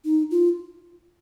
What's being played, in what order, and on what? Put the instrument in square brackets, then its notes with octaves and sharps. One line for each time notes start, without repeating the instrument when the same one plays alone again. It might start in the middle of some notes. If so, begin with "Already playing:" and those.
[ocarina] D#4
F4